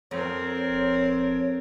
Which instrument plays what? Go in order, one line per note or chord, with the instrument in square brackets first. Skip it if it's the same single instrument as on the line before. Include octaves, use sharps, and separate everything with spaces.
[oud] F2 [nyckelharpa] C4 A#4 [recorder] C#5
[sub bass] D#1